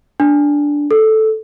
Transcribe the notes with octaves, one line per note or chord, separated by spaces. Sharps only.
D4
A4